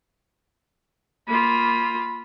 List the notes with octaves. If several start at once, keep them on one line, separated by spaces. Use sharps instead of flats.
A#3 F4 B5